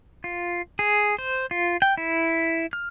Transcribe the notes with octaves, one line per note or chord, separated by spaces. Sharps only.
F4
G#4
C5
F4
G5
E4
F6